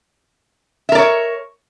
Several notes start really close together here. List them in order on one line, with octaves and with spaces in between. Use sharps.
E5 A#4 D5 C#5